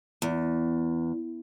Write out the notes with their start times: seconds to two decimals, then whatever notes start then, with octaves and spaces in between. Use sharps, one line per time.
0.22 E2